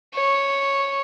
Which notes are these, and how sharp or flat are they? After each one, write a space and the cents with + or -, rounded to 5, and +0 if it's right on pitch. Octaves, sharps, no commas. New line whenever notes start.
C#5 -5